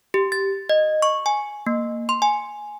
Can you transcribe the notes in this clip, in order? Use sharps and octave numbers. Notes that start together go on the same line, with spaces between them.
G4
A6
D#5
C#6
G#5
A#3
C6
G#5